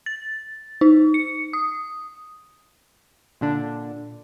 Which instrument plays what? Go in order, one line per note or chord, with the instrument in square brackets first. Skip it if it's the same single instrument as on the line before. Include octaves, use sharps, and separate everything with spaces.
[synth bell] A6
D#4
C#7
D#6
[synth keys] A#2 D3 D4